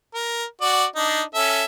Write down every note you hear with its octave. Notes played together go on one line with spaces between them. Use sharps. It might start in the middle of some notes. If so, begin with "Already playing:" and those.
A#4
F#4 D5
D4 D#4
C#4 A4 E5